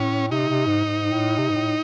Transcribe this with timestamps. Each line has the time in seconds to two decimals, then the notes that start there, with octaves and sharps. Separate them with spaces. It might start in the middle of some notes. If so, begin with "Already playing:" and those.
Already playing: A2 C#4
0.31 C3 D#4
0.49 C3
0.67 G#2
0.85 G#2
1.12 A2
1.38 C3
1.50 G#2
1.56 A2